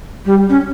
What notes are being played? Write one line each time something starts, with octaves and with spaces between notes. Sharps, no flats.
G3
C#4